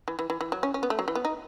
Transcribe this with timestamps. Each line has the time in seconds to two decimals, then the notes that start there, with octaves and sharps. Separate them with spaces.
0.08 E3
0.19 E3
0.30 E3
0.41 E3
0.52 F#3
0.63 C#4
0.74 C#4
0.83 B3
0.90 A3
0.99 F#3
1.08 E3
1.15 B3
1.25 D#4